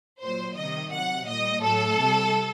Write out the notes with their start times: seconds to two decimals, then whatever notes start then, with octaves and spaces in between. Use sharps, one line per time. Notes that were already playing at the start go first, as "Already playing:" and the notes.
0.21 A#2 F#3 C5
0.56 C3 D#3 G3 D#5
0.92 C3 F#3 F#5
1.27 A#2 G3 D#5
1.63 A2 F#3 A4
1.99 C3 G3